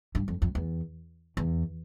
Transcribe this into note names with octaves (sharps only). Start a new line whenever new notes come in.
G2
F2
F2
E2
E2